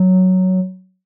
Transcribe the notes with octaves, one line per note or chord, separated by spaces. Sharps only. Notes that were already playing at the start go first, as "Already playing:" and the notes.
Already playing: F#3